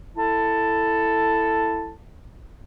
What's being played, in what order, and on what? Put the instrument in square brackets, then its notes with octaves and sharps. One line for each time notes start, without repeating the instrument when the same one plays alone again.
[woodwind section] E4 A4 A5